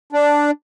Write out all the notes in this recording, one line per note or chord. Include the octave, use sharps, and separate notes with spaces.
D4